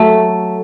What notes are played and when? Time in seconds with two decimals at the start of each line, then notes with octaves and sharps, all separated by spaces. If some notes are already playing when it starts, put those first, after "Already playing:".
Already playing: F#3 A3